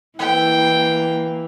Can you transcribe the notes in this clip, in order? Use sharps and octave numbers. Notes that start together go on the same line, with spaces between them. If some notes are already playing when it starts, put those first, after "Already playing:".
E3 A#3 G5